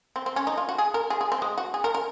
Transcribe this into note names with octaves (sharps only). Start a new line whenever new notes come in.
C4
C4
C#4
D#4
F4
F#4
G#4
A#4
G#4
G#4
C4
G#3
F#4
G#4
A#4
A#4